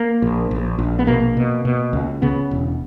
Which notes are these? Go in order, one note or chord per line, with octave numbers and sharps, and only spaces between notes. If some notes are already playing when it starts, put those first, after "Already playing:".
Already playing: A#3
A#1
A#1
A#1
B3
B2 A#3
B2
B2
C#2
C#3 B3
E1